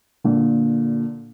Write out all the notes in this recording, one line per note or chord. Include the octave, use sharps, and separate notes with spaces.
A#2 D3